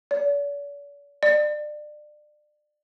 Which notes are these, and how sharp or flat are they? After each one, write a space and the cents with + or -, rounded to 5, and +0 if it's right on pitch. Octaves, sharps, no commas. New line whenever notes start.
D5 -45
D5 +30